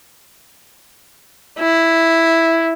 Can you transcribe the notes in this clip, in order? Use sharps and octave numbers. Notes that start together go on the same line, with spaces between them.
E4